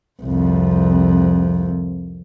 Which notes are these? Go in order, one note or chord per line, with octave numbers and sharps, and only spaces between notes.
C2 F2